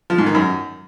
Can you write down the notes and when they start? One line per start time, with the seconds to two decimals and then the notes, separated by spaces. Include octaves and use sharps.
0.10 F3
0.18 G#2
0.26 D#3
0.35 F#2